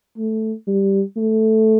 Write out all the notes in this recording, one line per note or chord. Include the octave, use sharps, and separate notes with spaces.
A3
G3
A3